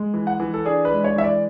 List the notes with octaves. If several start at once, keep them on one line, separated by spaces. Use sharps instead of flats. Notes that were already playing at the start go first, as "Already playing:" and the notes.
Already playing: G#3
E3
F#5
E3
A4
D4 G#4
B4
G#3
C#5
E3 E5
D5